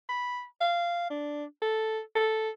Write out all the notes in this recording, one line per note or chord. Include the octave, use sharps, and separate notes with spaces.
B5
F5
D4
A4
A4